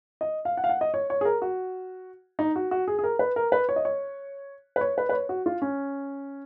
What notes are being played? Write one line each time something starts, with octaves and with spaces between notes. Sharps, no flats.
D#5
F5
F#5
F5
F#5
D#5
C#5
C#5
G#4
A#4
F#4
D#4
F#4
F#4
G#4
G#4
A#4
B4
A#4
B4
C#5
D#5
C#5
B4
C#5
B4
B4
C#5
F#4
F4
C#4